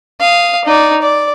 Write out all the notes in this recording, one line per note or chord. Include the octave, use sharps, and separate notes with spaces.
F5 D#6
D#4 D5
D5